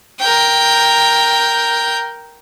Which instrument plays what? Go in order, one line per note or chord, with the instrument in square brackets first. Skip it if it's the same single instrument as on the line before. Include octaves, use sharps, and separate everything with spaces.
[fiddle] A#4 G5